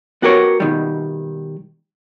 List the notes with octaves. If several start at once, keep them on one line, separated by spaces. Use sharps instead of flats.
B3 F#4 G4 A#4 C5 C#5
B2 D#3 G3